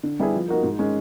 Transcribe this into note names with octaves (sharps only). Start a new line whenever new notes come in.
D3
G3 B3 E4 G#4
F3
A#3 D#4 F#4 A#4
G#2
D#3 G#3 C#4